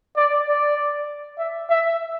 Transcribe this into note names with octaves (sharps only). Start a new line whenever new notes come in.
D5
D5
E5
E5